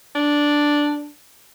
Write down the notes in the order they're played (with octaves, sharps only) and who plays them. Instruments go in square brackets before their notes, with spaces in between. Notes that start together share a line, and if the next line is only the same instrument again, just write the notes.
[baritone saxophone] D4